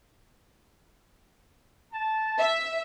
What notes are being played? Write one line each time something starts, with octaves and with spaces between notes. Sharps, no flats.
A5
E5